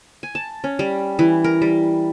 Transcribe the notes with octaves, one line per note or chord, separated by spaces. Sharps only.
G#5
A5
C#4
G3
E3
A#4
G3